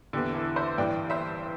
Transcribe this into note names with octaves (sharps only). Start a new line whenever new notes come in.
E2 D3 G4
E4 A4
C5 E5
G2 E3 D5 G5
C5 E5